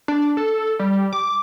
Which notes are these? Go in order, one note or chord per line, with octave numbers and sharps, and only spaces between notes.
D4
A4
G3
D6